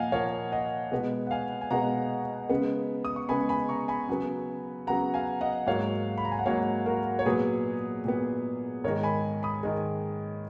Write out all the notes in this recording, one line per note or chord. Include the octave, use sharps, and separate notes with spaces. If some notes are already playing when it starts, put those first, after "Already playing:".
Already playing: A#2 F3 A#3 D#5 F5 F#5 G#5
A#2 F3 A#3 C#5 F5
D#5 F#5
B2 G#3 B3
F#5
F5 G#5
G#5
B2 G#3 B3 F#5 A#5
C#3 G#3 B3
D#6
C#6
C#3 G#3 B3 G#5 B5
G#5 B5
A#5 C#6
G#5 B5
C#3 F#3 B3
C#3 F#3 B3 F#5 A#5
F5 G#5
D#5 F#5
G#2 F#3 A#3 C#5 F5
B5
A#5
G#5
F#5
G#2 F#3 A#3 C#5 F5
F#4 A#4
C#5
A#2 F#3 B3 G#4 B4
A#2 F#3 B3
G#2 D#3 G#3 A#4 C#5
G#5 B5
B5 D#6
G#2 D#3 G#3